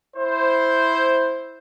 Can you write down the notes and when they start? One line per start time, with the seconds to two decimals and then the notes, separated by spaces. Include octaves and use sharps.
0.16 E4 C5